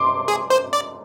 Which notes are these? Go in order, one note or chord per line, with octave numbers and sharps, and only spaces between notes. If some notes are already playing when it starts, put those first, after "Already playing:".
Already playing: C6 D6
G#4
C5
D5